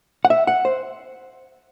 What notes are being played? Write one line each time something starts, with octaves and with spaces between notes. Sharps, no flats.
F#5
E5
F#5
C5